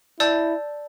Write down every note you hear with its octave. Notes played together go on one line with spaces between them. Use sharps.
E4 D5 A5 E6 G6